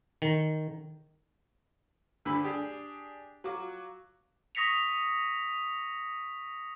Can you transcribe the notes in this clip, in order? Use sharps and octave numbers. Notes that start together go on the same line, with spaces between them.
D#3
D2 G2 D3 B5 E6
D4 G4 G#4
F#3 F4 F#4 D6
C#6 D#6 A#6 B6 C#7 F7